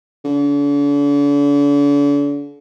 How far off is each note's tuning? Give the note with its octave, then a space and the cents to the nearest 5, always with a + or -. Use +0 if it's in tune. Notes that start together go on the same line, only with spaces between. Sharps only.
D3 -45